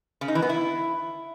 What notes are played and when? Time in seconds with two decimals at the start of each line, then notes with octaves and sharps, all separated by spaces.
0.21 C#3
0.28 D#4
0.35 E3
0.42 B3
0.49 E4